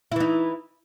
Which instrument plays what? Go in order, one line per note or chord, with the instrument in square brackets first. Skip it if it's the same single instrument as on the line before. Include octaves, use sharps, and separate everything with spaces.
[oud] E4
E3
D#4